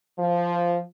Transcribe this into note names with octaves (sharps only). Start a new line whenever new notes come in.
F3